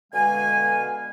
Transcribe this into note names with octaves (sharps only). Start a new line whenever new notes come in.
B2 D3 G#3 B4 F5 G#5